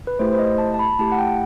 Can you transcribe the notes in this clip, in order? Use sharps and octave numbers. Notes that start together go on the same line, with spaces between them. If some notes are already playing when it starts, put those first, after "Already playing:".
B4
A3 E4 G4 C5
C5
D#5
A5
A5
B5
A3 E4 G4 A5
F#5
G5